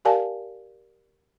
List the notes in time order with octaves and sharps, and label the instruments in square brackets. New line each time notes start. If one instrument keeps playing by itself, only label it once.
[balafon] G4 A#4 D5 F5 G#5 A5